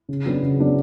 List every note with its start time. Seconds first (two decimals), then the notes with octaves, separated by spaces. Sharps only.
0.09 C#3
0.26 F#3 B3 D4
0.43 C#3
0.60 F#3 B3 D4